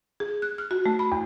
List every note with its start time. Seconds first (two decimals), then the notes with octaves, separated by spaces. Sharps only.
0.20 G#4
0.42 F#6
0.58 F6
0.71 F#4
0.86 A3
0.99 B5
1.12 E2